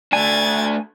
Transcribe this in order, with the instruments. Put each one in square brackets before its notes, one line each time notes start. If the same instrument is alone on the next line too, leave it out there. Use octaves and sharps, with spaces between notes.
[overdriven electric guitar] A3 D4 [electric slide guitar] G#5 [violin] G#6 A6